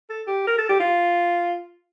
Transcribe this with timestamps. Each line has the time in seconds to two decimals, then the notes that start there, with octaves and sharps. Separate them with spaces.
0.10 A4
0.27 G4
0.48 A#4
0.58 A4
0.69 G4
0.80 F4